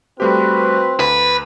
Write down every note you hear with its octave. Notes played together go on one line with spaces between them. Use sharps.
F3 G3 A3 C4 F#4 G4 B4
D2 B4